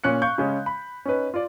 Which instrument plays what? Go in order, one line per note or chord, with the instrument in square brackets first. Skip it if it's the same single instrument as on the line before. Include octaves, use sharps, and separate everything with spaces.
[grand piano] A#2 C#4 F#6 C#7
F5 C#6 G6
C#3 G#3 C#4
B5
C#4 D#4 B4
F4 D5